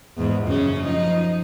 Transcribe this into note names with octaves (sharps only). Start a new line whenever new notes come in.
E2 G#2
F#2 C#3 C#4
F3 D#4